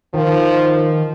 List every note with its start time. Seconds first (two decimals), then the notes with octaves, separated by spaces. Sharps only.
0.14 D#3 F3